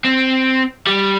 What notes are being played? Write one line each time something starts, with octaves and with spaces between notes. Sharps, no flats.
C4
G3